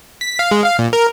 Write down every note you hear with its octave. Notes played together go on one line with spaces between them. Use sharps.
B6
F5
G#3
F5
A#2
A#4